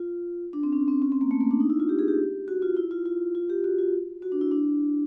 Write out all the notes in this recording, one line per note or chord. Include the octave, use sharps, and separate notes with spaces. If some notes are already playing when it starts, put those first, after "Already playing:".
Already playing: F4
D4
C4
C#4
C4
C#4
C4
A#3
A3
A#3
D4
D#4
E4
F4
G4
G#4
G4
F#4
F4
E4
F4
F4
F4
G4
F#4
F4
F#4
D4
E4
D4